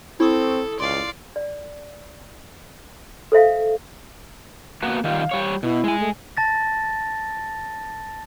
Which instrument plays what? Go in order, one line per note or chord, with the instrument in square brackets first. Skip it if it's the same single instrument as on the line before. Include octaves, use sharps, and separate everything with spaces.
[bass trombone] C4 [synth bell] E4 C#6 D#6 [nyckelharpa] A4
[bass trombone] C#2 [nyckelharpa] D5 F5 [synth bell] C6
[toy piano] D5
A4 C5 E5 F5
[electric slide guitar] A#3 B3 F#4
[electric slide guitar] D#3 G3 F4 [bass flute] F5
[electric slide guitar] G3 C#5
[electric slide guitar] B2 [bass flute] E4
[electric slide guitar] G#3 G#5
[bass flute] A3
[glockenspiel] A5 A6 A#6